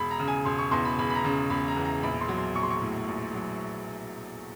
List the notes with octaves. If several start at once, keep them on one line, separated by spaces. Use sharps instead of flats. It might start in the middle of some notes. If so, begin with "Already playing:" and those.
Already playing: E1 B5
A#5
C#3
G#5
E1 C6
C#6
E2 C6
B5
E1 B5
B5
A#5
C#3
E1 B5
A#5
E2
A#5
A#1 B5
C6
F#3
C6
A#1 C#6
C6
C#6
A2
A#1
F#3